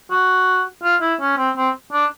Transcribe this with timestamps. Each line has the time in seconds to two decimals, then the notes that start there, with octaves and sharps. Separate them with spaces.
0.11 F#4
0.83 F4
1.01 E4
1.21 C#4
1.38 C4
1.57 C4
1.93 D4